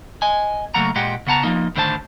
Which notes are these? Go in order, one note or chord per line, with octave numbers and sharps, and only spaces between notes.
D#5 G#5
C#3 F#3 A3 A#3 F#5 A#5
A#2 G#3 G4 D#5 F#5 G5
C#3 B3 F#5 A5 A#5
F3 G#3 A#3 D#4
A2 D3 D#3 C5 E5 A5